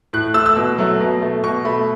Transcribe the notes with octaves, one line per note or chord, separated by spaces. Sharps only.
A2 F#6
A3 E6
E6
B2
F#3 A3
B2
A3
B2 C#6
A3 B5